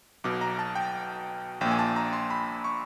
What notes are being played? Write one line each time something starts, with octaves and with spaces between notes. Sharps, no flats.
B1 B2 D6
A#5
A5
G5
A#1 A#2 G5
G#5
A5
A#5
C6
B5
C#6